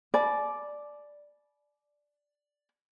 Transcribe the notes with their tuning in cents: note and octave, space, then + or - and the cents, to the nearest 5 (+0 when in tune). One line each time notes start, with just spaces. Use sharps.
D5 +0 G#5 +45 B5 -20